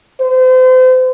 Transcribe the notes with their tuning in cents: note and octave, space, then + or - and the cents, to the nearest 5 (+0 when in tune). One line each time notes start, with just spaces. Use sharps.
C5 -35